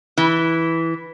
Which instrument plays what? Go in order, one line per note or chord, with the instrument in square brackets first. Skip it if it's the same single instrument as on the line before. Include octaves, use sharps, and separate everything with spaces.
[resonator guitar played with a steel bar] E3